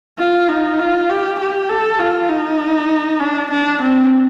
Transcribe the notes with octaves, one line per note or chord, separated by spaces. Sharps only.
F4
D#4
F4
G4
G4
A4
F4
D#4
D4
D4
C4